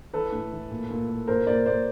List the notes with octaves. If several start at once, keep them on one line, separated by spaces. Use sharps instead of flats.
E3 A4 B4
A2
E3
A#2
A#2
A#2
A#2 A#4 C5
A#2 C5 D5
A#2 C5 D5